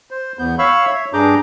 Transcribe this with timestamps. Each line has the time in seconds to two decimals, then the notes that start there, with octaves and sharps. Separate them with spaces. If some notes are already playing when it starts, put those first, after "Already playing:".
0.11 C5
0.39 E2 B3 G6
0.59 C#5 F5 B5 C#6 E6
0.87 C#5 E5
1.13 G2 D4 G#4 A#5 D6 G6